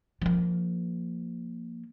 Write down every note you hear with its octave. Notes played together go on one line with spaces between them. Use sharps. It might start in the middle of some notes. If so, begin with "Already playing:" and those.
F3 A#3